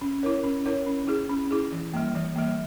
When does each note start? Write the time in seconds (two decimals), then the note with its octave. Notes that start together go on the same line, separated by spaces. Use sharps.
0.01 C#4
0.23 E4 A#4 C#5
0.44 C#4
0.66 E4 A#4 C#5
0.87 C#4
1.07 E4 G#4
1.29 C#4
1.51 E4 G#4
1.72 E3
1.94 G3 A#3
2.15 E3
2.36 G3 A#3